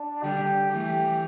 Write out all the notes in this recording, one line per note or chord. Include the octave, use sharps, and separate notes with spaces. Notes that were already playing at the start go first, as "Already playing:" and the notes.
Already playing: D4
D3 G3 G4
E3 A3 G4